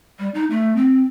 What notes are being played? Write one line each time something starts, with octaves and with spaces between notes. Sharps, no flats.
G3
D#4
A3
C4